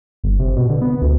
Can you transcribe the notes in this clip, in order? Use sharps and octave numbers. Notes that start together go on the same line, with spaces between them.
G1
C3
B2
D3
B3
D2